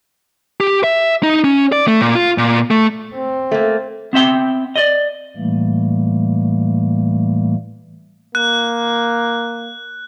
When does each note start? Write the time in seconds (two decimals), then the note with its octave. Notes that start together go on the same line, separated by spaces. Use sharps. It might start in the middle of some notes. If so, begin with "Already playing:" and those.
0.60 G4
0.84 E5
1.23 D#4
1.44 C#4
1.72 D5
1.88 A3
2.01 A#2
2.15 F4
2.38 A#2
2.71 A3
3.14 C4
3.51 A3 A#3
4.13 B3 C4 E5 G5
4.76 D5 D#5
5.37 A2 E3 G3 A3 A#3
8.35 A#3 F#6